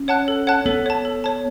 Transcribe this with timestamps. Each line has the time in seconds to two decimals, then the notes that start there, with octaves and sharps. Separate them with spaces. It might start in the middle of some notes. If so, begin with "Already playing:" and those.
Already playing: C#4
0.08 C#5 F#5 A5 F#6
0.28 A4
0.47 C#5 F#5 A5 F#6
0.66 B3 A4
0.86 C#5 A5
1.05 A4
1.24 C#5 A5